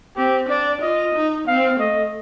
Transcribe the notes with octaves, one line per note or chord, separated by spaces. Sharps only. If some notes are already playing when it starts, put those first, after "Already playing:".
C4 G4
D4 D5
F4 D#5
D#4
C4 F5
A3 D#5